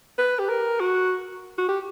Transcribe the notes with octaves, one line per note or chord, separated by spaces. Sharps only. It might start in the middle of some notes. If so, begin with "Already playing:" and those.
B4
G4
A#4
F#4
F#4
G4